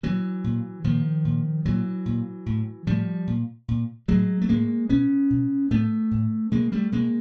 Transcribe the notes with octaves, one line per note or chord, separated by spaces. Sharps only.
A#2 E3 F#3
A#2
A#2 D#3 F3
A#2
A#2 E3 F#3
A#2
A2
A2 F3 G3
A#2
A#2
A2 F#3 G#3
A3
A2 G#3 A#3
B2 B3 C#4
B2
A2 A3 B3
A2
B2 G#3 A#3
G3 A3
B2 G#3 A#3